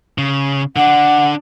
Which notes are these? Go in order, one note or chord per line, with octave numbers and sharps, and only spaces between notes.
C#3
D3 D4 F#5